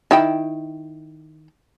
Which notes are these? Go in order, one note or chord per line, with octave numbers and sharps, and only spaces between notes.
D#3 E4 G5